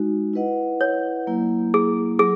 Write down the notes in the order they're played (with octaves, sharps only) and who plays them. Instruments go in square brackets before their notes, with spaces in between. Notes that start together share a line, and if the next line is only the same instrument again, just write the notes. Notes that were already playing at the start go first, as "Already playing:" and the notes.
Already playing: [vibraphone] G#3 D#4 F#4
E4 B4 D#5 F#5
[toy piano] C#5
[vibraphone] F#3 A#3 E4
[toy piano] G#4
[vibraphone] F#3 [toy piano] G#4